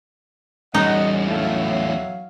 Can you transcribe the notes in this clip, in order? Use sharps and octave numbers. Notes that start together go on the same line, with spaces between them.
E2 G3 C#4 D#4 A4 D#5 F#5
A2 F#3 A4 E5 F5